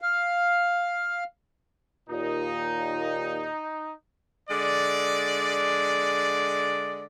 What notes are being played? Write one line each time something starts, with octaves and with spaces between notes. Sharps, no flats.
F5
D#2 A#2 D#4
D3 G#3 D5